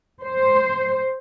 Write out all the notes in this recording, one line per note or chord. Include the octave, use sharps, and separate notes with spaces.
C5